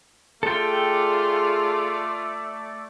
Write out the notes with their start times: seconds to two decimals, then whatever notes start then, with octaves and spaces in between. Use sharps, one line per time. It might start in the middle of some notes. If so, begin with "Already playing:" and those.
0.43 A3 F4 G#4 A4 D5 G5